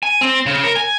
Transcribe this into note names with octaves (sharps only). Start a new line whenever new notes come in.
G#5
C4
C#3
A#4
G#5